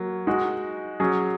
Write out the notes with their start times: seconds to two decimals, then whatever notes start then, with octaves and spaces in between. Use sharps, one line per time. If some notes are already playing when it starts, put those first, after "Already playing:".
Already playing: F#3 A#3
0.27 G#3 D#4 F#4
1.00 F#3 C#4 G#4